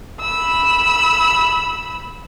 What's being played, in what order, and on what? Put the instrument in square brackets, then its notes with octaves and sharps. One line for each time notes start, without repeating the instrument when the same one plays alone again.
[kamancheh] B5 E6